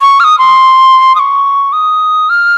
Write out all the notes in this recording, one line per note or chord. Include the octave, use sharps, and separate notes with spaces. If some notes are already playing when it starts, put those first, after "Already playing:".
C#6
F6
D#6
C6
D#6
C#6
D#6
F6